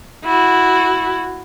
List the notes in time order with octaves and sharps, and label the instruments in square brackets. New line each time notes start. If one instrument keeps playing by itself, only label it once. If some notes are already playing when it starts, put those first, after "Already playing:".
[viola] E4 F#4